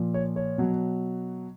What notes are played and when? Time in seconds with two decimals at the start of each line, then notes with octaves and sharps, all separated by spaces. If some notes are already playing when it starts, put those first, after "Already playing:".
Already playing: A#2 F3
0.14 C#5
0.36 C#5
0.58 B2 F#3